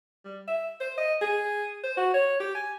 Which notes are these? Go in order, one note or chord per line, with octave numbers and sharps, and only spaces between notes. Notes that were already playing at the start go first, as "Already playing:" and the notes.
G3
E5
C5
D#5
G#4
C5
F#4
C#5
G4
G#5